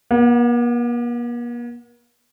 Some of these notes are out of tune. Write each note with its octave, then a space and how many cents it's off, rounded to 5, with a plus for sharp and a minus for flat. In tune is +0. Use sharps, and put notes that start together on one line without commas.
A#3 +45 F#5 +0